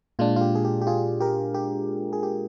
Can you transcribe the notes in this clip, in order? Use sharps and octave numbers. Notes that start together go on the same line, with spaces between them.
A#2 G#3 D4 F4
F4
G4
G#4
G4
G4
F4 G#4
G4 A#4
G4
G#4
G4